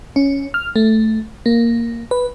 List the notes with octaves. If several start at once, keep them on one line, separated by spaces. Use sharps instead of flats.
C#4
F6
A3
A#3
B4